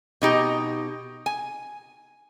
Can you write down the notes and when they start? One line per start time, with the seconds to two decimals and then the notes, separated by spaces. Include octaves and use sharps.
0.22 B2 D#4 G4
1.26 G#5